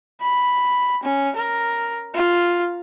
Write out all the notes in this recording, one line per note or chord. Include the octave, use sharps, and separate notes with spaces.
B5
C#4
A#4
F4